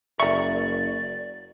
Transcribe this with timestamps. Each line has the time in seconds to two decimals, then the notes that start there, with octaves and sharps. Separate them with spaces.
0.20 F#1 A#4 D5 E5 C#6